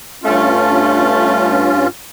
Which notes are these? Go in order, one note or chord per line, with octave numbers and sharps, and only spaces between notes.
G2 A3 C#4 F4